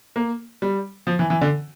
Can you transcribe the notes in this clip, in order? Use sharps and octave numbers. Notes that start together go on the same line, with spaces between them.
A#3
G3
F3
E3
E3
D3